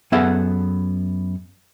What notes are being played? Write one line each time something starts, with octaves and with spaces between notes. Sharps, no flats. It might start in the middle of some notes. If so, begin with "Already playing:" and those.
F#2 B3 G#4 A4 E5 F#5